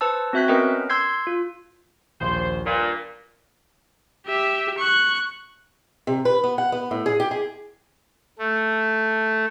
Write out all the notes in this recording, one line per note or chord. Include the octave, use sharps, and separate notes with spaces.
B4 C5 A5 E6
C4 F#4 E5 F#6 G6 B6
B3 C#4 A#4 B4 D#5 G5
C6 E6 G6 G#6 C7
F4
A#1 D#2 C5
G2 A#2 A#4 F5 D#7
G4 E5
C#6 F#6
C3
B4
B3
F#5
B3
A2
G#4
G4
G#4
A3